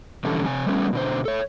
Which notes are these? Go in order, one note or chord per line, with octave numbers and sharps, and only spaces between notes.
B2 D3 E3 G3 C#4 A4
C3 G#5
G3 A3 B3 C#4
B2 D3 C5
A4 C#5